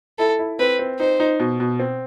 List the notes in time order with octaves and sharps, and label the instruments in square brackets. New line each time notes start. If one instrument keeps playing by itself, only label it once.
[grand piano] E4 [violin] A4
[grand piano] E4
[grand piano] C4 [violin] B4
[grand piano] C4
[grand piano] D#4 [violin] C5
[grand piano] D#4
B2
B2
C4